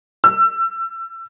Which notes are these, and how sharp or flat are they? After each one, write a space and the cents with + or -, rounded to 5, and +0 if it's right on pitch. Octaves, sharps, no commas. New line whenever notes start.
E6 +30